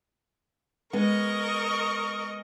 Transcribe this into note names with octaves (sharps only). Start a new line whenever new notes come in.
G#3 B3 A#4 D#5 C#6